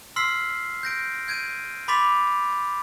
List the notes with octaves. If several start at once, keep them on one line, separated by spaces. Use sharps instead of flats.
C6 E6 F6 B6 C7
G6 A#6 D7
G6 G#6 D7 D#7
B5 C6 D6 A6 B6 F7